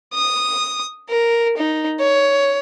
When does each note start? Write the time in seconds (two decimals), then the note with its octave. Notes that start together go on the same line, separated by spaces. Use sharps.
0.14 D#6
1.09 A#4
1.57 D#4
1.99 C#5